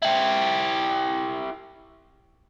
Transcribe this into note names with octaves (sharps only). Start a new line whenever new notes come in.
E4 G4